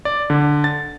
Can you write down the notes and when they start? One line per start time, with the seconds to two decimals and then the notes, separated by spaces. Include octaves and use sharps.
0.05 D5
0.30 D3
0.64 A6